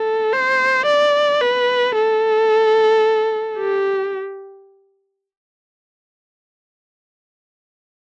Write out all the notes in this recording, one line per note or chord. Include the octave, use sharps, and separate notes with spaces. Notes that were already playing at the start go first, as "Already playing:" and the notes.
Already playing: A4
C5
D5
B4
A4
G4